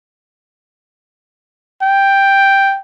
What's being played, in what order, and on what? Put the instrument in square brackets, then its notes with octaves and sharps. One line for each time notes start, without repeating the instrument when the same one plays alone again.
[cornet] G5